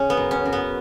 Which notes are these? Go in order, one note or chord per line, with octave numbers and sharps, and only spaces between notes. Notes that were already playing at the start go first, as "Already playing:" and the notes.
Already playing: C#3 C#4
B3
F#2
C#4
F#2
B3